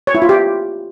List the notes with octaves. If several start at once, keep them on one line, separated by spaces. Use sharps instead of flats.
C#5
E4
F4
G4